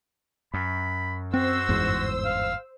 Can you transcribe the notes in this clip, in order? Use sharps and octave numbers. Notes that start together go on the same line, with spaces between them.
F#2 B5
C4 F#4 C5 E6
G1 E2 G#2
F5